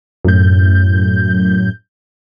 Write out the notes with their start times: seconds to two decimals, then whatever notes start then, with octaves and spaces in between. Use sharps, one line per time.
0.24 F#2 A2 G6